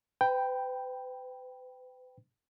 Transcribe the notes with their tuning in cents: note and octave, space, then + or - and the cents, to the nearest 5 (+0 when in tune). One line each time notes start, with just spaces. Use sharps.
B4 +40 G5 +0 B5 -10